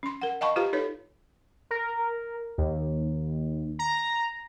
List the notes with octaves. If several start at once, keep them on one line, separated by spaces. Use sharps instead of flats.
C#4 C6
A#4 F#5
D#5 F5 G5 A5 B5 C#6
F4 G4 B4 F5 A#5
D#4 A4 B4 C#5
A#4
D#2
A#5